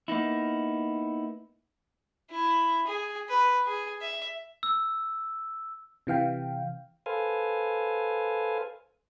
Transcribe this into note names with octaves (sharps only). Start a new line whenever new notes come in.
A#3 B3 D#4 E4
E4
G#4
B4
G#4
E5
E6
C3 E3 F5 G5
A4 B4 C5 F5 G#5